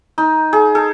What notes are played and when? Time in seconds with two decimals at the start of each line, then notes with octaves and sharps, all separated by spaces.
0.18 D#4
0.53 G#4
0.75 A4